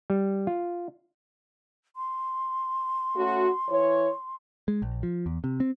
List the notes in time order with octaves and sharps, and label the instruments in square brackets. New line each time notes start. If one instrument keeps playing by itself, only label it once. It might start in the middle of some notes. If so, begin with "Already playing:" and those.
[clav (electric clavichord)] G3
F4
[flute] C6
[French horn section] A3 C#4 F#4
E3 E4 C#5
[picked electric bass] G#3
A#1
F3
E2
C3
C4